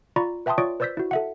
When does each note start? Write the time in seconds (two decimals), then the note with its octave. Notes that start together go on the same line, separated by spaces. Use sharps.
0.16 F4 D5 A#5 B5 C#6
0.46 B4 E5 G5 A5 C6 D#6
0.58 F4 C#5 D5 C#6 D#6 D7
0.80 B4 C5 D5 E6 G6 B6
0.97 E4 F#4
1.11 A4 E5 F#5